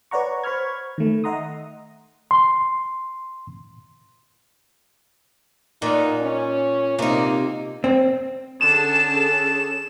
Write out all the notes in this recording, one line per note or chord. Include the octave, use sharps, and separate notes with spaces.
B4 C#5 D5 F#5 A#5 C#6
C5 B5 C#6 F6 G#6
D#3 A3
D#5 E5 F#5 A#5 C6 D#6
C6
A#2 D#4 F#5
C#4
C3 A#3 D#4
C4
D3 C#4 G#4 A4 A5 E7